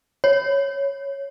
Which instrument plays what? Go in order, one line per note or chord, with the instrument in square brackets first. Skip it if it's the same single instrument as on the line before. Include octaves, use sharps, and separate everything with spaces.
[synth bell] C#5